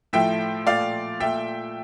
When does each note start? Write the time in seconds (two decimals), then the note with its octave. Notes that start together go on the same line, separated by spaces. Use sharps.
0.13 A2 F3 A3 E5 G5
0.67 A#2 A3 D5 F5
1.20 A#2 A3 E5 G5